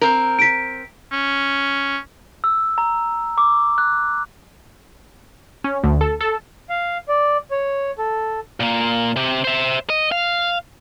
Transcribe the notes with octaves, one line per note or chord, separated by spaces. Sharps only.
C4 A#4
B6 D7
C#4
E6
A#5
D6
F#6
C#4
D2
A4
A4
F5
D5
C#5
A4
A#2 A#3
C3 G4
C5 E5
D#5
F5